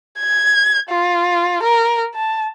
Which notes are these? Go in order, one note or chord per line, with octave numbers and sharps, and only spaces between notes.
G#6
F4
A#4
A5